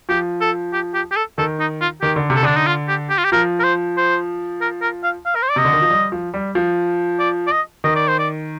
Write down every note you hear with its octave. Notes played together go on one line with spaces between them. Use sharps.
F3 G4
A4
G4
G4
G4
A4
D#3 A4
D#4
F4
D#3 G4
D3
C3
A4
D3 D4
D#4
F4
G4
G4
F4
G4
F3 A#4
A#4
C5
C5
A#4
A#4
F5
F5
A#4
C5
D5
C3 D#5
D3
D#3
F3
G3
F3
G3
F3
D5
D5
D#5
D#3 D#5
D5
C5
D5